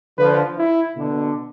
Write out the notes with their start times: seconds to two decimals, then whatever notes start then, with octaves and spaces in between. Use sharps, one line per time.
0.18 D3 F3 B4
0.58 E4
0.96 B2 D3